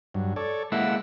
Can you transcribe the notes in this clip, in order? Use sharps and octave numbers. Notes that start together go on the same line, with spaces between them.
G2 F#3
A4 C#5 D5
G#3 A#3 E4 F#5 E6